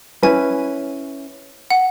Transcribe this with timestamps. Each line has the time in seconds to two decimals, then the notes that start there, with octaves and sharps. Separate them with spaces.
0.23 C#4 E4 B4 G#5
1.70 F#5